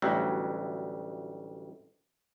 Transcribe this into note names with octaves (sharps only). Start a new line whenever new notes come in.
A1 D2 F#3 G3